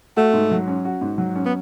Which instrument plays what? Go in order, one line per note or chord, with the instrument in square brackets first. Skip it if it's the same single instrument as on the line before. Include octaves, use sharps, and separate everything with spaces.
[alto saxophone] A3 [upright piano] F#4
[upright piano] G#2
F#3
C#4
F#4
G#2
F#3
C#4
[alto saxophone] B3